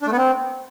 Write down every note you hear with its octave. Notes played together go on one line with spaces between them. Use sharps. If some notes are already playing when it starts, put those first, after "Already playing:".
D4
A3
B3
C4